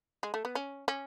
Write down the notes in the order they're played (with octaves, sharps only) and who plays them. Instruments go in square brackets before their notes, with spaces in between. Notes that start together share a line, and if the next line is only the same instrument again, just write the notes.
[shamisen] G#3
A3
B3
C#4
C#4